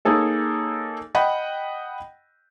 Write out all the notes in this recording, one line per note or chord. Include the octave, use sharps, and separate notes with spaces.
A#3 D#4 G#4 A4 C#5
D#5 F#5 G5 B5